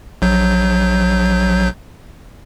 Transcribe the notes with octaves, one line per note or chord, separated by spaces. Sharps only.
A#1 F#3 G6